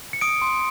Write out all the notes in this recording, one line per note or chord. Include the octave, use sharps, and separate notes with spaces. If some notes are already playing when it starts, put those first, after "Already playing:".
C#7
D#6 D7
C6